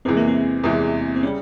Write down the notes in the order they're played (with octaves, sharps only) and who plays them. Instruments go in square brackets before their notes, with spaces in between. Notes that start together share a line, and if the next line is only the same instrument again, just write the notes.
[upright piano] E2 C3 E3 G#3 [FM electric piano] C4
[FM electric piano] A#3
C4
[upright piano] E2 C3 E3 G#3
[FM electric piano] C4
[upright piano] C#3 G3 [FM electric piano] C#4